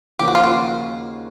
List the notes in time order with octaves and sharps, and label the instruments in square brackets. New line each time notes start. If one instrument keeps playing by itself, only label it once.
[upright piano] D#2 C#3 F3 A#3 C#4 [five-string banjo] G4
[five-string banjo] F#4
F4
F#4